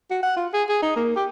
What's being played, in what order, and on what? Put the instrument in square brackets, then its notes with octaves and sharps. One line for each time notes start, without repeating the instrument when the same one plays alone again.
[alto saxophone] F#4
F#5
F4
G#4
G#4
D#4
A#3
G4